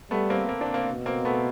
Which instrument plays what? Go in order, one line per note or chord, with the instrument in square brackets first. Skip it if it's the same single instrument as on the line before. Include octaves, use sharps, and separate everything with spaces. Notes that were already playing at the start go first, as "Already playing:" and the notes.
[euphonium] G3 [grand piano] A3 B3
[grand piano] A#3 C4
A#3 C4
C4 D4
A#3 C4
[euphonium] B2
[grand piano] A#3 C4
A3 B3